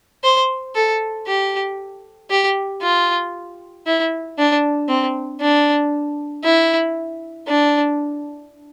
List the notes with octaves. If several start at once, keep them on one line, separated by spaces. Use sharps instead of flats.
C5
A4
G4
G4
F4
E4
D4
C4
D4
E4
D4